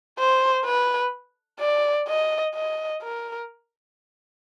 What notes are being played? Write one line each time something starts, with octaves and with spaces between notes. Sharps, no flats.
C5
B4
D5
D#5
D#5
A#4